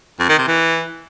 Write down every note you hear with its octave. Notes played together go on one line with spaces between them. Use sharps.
F2
D#3
C3
E3